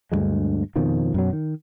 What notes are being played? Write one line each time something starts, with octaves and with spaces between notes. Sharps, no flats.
D2 G2 F#3 G#3
F2 B2 D#3 F3
F#2 B2 F#3
D#3